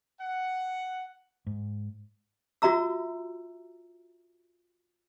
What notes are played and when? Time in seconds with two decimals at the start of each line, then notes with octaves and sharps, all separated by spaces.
0.20 F#5
1.47 G#2
2.62 F4 F#4 E5 A#5 E6